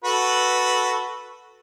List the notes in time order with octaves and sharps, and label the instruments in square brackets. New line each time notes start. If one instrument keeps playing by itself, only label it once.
[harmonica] F#4 A4 B4